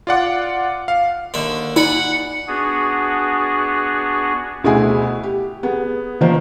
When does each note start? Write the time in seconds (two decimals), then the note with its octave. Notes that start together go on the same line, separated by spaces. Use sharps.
0.07 F4 D5 F#5 D6
0.88 F5
1.34 D#2 D3 E5
1.76 D#4 D5 F#5 G#5 B5
2.48 B3 D4 F#4 G#4
4.64 D2 B2 E4 F#4 G#4 G#5
5.23 G4
5.63 B3 G#4
6.21 D#3 F3 A#3 C5